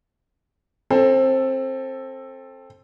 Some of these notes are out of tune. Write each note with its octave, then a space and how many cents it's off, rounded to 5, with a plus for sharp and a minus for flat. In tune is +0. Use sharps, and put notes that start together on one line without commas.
C4 +20 A4 +0